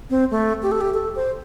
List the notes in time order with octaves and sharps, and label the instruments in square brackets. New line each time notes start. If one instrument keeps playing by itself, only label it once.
[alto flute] C4
A3
G4
A4
G4
A4
C5